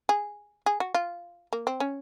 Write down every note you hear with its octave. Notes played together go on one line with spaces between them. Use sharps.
G#4
G#4
F#4
F4
A#3
C4
C#4